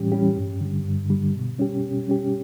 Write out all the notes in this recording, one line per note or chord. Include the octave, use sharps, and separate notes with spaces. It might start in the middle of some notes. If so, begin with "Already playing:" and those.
Already playing: A2 E3 G3 C#4 G4
E3 G3 C#4 G4
G2
D3 G3
G2
D3 G3
B2
G3 C#4 G4
B2
G3 C#4 G4